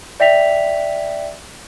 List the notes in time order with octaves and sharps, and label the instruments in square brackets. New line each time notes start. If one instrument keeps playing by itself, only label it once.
[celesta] D5 E5 G5 B6 F7